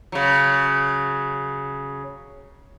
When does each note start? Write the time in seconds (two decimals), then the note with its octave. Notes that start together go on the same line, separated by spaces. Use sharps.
0.12 C#3 F#3